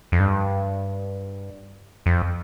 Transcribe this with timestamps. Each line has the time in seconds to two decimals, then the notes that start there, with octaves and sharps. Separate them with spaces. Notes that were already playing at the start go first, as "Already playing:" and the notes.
0.12 F2
0.20 G2
2.06 F2